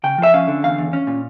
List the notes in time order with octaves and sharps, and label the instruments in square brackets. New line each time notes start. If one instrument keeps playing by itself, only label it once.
[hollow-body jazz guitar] C#3 G5
F3
E5
C#4 F5
D3
E2 F5
E2
C#4
A#2